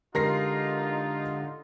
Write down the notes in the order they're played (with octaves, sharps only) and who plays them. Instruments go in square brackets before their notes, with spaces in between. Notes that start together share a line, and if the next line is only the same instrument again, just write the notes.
[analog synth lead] D3 [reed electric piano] G#3 G4 [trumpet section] D#4 F4 [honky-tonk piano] A#4 A#6 C7